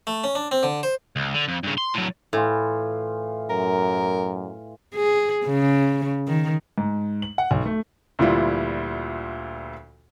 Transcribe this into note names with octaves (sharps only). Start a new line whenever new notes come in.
A3
C#4
D4
C4
D3
C5
C#2
D3
F2
G2 C#3
C6
A2 F#3
A2 E3 F4
F#2 A#4
G#4
C#3
D#3
G#2
F#7
F#5
B1
A3
D2 A#2 E3 G3 E4 F4